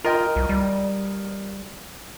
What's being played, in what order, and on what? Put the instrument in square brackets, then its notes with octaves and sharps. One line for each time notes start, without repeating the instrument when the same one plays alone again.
[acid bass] F4 [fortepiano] A#4 D#5 G5
[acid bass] C2
G3